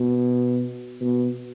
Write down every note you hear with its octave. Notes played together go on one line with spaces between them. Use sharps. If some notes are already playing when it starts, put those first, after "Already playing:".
Already playing: B2
B2